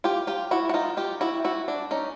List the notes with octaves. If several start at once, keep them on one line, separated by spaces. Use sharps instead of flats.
F4 G4
F4 G4
E4 F#4
F#4
D#4 F4
F4 G4
E4 F#4
E4 F#4
D4
C#4 D#4